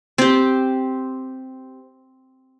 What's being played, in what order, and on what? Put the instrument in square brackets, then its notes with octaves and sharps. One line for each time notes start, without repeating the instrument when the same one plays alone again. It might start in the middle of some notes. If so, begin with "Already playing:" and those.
[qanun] C4 G4